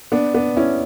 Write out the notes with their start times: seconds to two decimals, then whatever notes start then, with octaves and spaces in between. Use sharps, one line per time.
0.12 B3 D4
0.34 B3 D4
0.57 C#4 E4